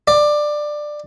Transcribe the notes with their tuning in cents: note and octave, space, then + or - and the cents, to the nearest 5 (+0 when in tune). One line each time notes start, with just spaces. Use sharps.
D5 +15